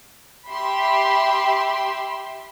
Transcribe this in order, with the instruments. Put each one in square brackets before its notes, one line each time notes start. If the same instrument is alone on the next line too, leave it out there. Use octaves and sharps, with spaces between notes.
[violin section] G4 E5 B5 C6